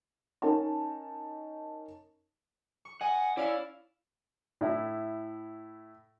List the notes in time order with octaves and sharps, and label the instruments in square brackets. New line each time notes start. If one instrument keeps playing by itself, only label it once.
[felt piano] C#4 D#4 A#4 C#5 D#5 A5
[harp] C#6
[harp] D#5 [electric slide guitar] F#5 [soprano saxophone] G#5
[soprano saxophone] C#4 [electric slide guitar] E4 [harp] D5 F5 E6
[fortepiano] A2 E4